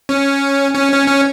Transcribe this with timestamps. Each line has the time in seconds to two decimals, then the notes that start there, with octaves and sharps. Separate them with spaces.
0.09 C#4
0.75 C#4
0.92 C#4
1.07 C#4